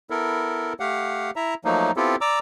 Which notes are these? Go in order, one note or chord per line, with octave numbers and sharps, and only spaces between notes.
B3 E4 A4 A#4
A3 G4 F5 F#5
E4 E5 A#5
F3 F#3 A3 A#3 D#4
B3 C4 E4 F4 G4 A4
D5 A#5 D6 E6